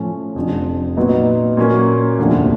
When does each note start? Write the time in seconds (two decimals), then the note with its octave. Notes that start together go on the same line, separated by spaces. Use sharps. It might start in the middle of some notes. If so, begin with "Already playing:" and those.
Already playing: A2 F3 A3 C#4
0.35 F1 F2 D3 F3
0.97 A#2 F#3 B3 D#4
1.57 A#2 F#3 A#3 C#4
2.19 F1 D#2 D3 F3 A3